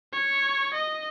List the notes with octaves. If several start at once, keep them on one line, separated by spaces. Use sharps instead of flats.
C#5
D#5